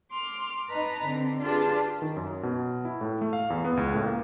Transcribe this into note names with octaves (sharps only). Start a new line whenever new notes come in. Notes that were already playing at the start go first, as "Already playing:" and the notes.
C6 D6 F6
D#4 B4 A5 A#5
D3 C4
D4 F4 G4 G#4 B4 A5
D#3
F#2
B2
E4
A2
A3
F5
E2
B3
C#2
A2
A#3